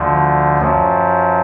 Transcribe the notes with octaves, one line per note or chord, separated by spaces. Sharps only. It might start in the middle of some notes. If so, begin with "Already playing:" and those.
Already playing: D2 D3 F3
F#2 F3